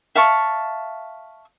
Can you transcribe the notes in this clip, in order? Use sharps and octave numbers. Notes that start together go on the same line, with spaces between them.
E5 F5 A5 C#6